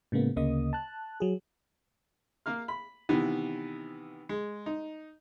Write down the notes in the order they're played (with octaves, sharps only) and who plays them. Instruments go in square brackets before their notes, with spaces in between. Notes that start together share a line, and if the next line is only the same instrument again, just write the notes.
[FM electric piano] A2 C#3 G#3 A#3 B3
D2 C#3 A#3 D#5 D#6
A5 F#6
F#3 G#4
[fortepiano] A#3 F5 F6
B5
C3 D#3 E3 B3
G#3
D#4